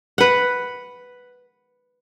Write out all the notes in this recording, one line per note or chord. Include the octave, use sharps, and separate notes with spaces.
B4 F#5